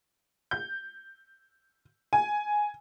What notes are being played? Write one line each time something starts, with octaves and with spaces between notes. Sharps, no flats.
G6
G#5